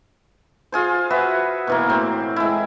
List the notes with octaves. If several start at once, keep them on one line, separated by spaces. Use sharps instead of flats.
F4 G#4 C5
F#4 B4 E5
B2 E3 A#3
A2 C4
G#3 E4